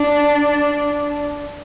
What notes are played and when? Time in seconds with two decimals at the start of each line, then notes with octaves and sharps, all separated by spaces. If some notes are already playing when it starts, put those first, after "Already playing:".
Already playing: D4